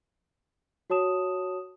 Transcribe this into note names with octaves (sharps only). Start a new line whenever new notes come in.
F#4 C#5 A5 D#6 E7